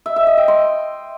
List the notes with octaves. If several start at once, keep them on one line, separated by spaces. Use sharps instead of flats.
E5
E5
D#5
G5
C6